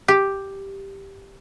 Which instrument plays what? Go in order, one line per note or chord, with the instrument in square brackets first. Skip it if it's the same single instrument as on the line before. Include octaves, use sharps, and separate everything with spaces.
[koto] G4